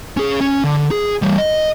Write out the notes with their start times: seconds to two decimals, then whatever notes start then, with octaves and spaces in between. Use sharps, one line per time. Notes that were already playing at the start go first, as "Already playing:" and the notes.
0.17 C#4 G#4
0.41 C#4
0.64 D3
0.91 G#4
1.22 E3 G3
1.38 D#5